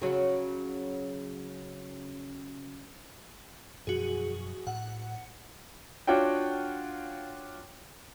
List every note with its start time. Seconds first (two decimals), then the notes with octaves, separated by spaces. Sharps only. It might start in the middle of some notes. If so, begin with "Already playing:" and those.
0.01 C#3 F#3
3.87 F#2 B2 F3 F#4 G#4
4.67 A2 F#5
6.07 D4 F4 F#4 C#5 F#5 G5